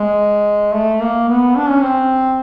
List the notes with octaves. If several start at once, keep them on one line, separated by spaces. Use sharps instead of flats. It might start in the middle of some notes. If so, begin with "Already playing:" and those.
Already playing: G#3
A3
A#3
B3
D4
C#4
C4